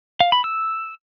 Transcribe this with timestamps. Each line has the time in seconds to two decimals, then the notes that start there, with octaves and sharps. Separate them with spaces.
0.20 F5
0.32 B5
0.44 E6